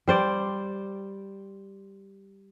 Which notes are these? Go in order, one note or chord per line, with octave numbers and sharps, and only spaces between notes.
G3 C5 D5